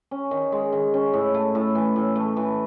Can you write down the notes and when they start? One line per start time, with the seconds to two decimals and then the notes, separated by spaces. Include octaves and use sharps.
0.11 C#4
0.31 D#3
0.52 G#3
0.73 D#3
0.94 C#4
1.13 A2
1.34 A3
1.55 A2
1.75 E3
1.96 A2
2.16 A3
2.37 E3